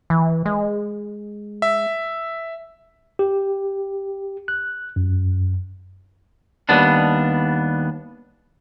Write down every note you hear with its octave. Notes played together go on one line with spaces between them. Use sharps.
E3
G#3
E5
G4
F#6
F#2
D#2 G3 B3 D4